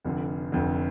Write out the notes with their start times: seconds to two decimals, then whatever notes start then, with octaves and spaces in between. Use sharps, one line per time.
0.05 F1 F2 D3
0.52 F1 F2 D3